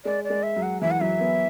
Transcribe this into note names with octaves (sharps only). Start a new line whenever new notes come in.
G#3 D5
D5
G#3
E5
F#3
F#5
E3 E5
F#5
F#3 E5
B3